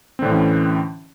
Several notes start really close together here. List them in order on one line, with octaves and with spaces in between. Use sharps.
C4 D3 A2 E3 C#4